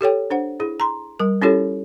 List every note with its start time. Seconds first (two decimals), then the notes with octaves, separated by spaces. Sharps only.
0.01 G4 A4 C#5 G5
0.30 D4 C5 F#5
0.60 E4 G#4
0.80 A#5 C6
1.20 G3 A#4
1.42 C#4 E4 F4 G4 A4 C#5